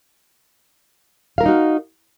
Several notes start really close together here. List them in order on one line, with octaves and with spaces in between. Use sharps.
F5 A#4 E4 D#4 F#4